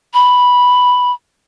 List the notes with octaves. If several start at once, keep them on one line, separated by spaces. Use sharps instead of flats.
B5